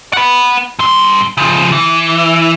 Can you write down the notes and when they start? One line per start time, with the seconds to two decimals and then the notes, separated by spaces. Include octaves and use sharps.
0.13 F#5 B5
0.79 G2 C6
1.37 C#3 F3
1.72 E3